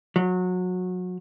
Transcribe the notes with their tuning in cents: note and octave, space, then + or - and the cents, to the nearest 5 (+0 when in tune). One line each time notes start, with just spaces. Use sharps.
F#3 -25